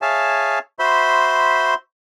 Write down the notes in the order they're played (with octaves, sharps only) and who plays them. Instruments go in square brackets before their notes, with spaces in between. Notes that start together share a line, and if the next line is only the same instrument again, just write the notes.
[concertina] G#4 C#5 E5 F5 G#5 A5
F#4 C5 E5 B5 C6